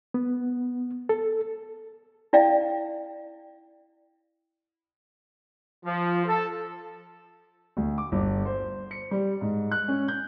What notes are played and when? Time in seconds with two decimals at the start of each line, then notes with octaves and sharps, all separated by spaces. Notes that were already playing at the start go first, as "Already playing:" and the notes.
0.14 B3
1.09 A4
2.33 E4 D5 F5 G5
5.86 F3
6.26 A4
7.77 D2
7.98 D6
8.12 G1
8.46 C5
8.91 C#7
9.11 G3
9.41 G#2
9.71 F#6
9.88 C#4
10.08 G6